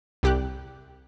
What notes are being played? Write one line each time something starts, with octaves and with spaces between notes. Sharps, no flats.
C2 G4 F#6